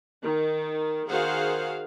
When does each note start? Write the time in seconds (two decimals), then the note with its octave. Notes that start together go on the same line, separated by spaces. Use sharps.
0.23 D#3
1.09 D#3 F#4 G#4 C5 F5 F#5